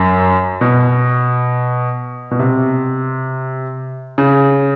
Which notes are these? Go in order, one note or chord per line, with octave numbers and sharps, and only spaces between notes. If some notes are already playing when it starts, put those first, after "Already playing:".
Already playing: F#2
B2
B2
C3
C#3